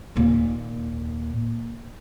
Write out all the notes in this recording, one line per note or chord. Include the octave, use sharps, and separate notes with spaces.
D#2 A#2